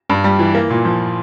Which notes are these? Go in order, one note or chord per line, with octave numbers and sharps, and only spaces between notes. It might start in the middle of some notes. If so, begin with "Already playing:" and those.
G2
G3
E3
A#3
A#2
F3